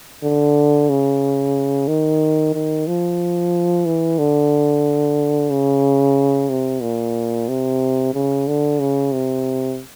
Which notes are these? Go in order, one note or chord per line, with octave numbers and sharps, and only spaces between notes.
D3
C#3
D#3
D#3
F3
E3
D3
C#3
C3
A#2
C3
C#3
D3
C#3
C3